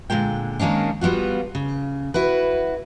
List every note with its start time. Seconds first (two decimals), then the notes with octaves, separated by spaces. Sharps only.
0.10 A#2 D3 F#3 G#3 G5
0.59 D#3 G#3 A#3 C#4 D4
1.01 G3 B3 F4 F#4
1.55 C#3
2.14 E4 F#4 B4